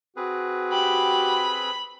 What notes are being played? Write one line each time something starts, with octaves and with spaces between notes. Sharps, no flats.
C4 F#4 G#4 B4
G4 B5